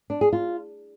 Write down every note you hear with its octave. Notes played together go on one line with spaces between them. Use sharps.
D4
G#4
F4